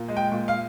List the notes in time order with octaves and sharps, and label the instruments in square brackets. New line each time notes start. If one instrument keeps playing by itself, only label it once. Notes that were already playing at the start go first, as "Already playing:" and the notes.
Already playing: [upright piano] A#2
G#3
G5
A#2
F5